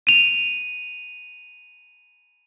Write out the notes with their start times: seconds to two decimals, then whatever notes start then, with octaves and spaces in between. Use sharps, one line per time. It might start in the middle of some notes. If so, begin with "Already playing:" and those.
0.07 D#7 F7